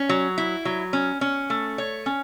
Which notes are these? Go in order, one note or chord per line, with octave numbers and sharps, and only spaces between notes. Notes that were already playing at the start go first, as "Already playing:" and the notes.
Already playing: C#4
F#3
E4
F#3
C#4
C#4
A3
C#5
C#4